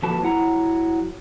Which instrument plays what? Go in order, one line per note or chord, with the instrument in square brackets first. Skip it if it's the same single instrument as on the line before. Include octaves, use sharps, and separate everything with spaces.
[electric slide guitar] A#2 F3 F#4 A4 B4 A5
F#3 E4 F#5 A#5